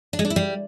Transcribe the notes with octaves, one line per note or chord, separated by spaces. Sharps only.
D4
G#3
D4
E4
G3